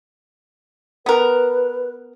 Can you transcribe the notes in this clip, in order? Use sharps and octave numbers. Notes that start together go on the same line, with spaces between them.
B3 A#4 B4